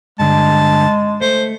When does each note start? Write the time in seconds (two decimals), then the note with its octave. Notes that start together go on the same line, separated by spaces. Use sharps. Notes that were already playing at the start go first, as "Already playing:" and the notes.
0.20 G2 D3 G#3 D4 A5
1.21 A3 C5